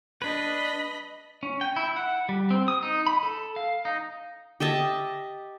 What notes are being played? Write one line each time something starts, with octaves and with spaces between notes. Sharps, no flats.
D4 B4 D#5 B5
C#4
G5
E4
F#5
G3
C4
D#6
D#4
B5
A4
F5
D#4
G4 D#5 E5 A5